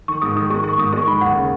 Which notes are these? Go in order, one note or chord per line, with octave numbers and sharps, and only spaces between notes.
D#3 C#6
G#2 D#6
D#3 D#6
G#3 C#6
D#3 C#6
G#2 D#6
G#3 C#6
D#3 B5
D#2 F#5
C#3